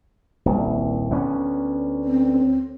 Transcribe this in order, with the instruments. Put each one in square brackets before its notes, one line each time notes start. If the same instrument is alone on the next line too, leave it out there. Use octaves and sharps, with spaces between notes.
[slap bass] D#1 C2
D2 B3 C#4
[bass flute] C4